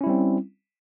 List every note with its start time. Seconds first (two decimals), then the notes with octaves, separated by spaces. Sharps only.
0.01 C#4
0.04 E4
0.07 G3
0.09 C4